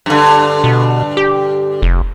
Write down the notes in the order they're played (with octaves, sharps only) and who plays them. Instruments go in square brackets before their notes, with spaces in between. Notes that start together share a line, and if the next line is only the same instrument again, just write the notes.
[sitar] G2 D3
[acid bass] B2
G4
F1